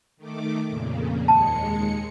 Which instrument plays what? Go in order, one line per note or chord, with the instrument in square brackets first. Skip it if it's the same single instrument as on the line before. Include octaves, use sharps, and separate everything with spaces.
[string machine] D#3 A3 D6
F2 A#2 C#3
[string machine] D#2 G#3 C#7 [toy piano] A5